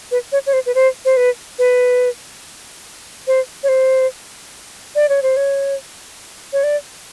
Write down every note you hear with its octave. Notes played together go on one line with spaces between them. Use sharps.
B4
C#5
C#5
C5
B4
C5
C5
B4
B4
C5
C#5
C5
D5
C#5
C5
C#5
C#5
D5